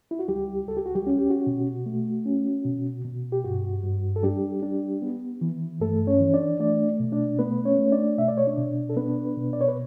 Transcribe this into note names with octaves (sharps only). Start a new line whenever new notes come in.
E4
F#4
C#2 G3 G4
C#2 A4
G4
F#4
G3 G4
C#4 F#4
G4
F#4
B2
A3
C#4
B2
B2
G4
G2 F#4
G2
A4
G3 D4 G4
D4
B3
E3
G2 A3 A4
C#4 C#5
E3
D4 D5
A3 D4 D5
B2
D4 D5
A3 B3 B4
C#4 C#5
A3
D4 D5
B2 E5
D5
C#5
D4 D5
B2
A4
B3 D4 B4
B2
D5
C#5
B4